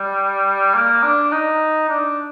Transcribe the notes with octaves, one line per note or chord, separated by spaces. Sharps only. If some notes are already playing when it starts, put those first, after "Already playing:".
Already playing: G3
A#3
D4
D#4
D4